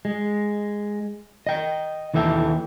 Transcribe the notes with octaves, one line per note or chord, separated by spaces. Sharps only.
G#3
D#5 G5
D#2 E3 A4 E5 G5